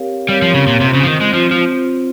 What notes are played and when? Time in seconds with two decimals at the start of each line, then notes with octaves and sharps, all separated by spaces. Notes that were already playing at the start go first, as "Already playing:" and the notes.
Already playing: C4 G4 A#4 C#5 F5
0.29 G3 C4 G4 A#4 C#5 F5
0.42 F3
0.54 C#3
0.67 A#2
0.81 C3 C4 F4 C5
0.94 C#3
1.03 F3
1.07 D#3
1.21 G#3
1.33 F3 C4 F4 C5
1.51 F3